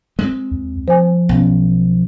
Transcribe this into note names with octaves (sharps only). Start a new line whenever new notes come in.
G#3 A#3 C4
D#2
F3 C5 G#5
B1 B3 C#4